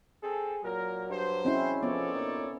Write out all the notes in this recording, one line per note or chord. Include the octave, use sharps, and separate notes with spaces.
C4 G#4 A4
A#2 F#3 A#4
G2 C5
G#3 C4 C#4 E4
F3 B3 A4 C#5 D5
A#2 D#4